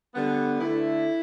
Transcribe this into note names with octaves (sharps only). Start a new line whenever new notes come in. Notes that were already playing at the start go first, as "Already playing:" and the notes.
D3 G3 B3
D3 A3 E4